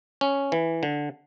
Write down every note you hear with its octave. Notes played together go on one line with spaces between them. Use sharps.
C#4
E3
D3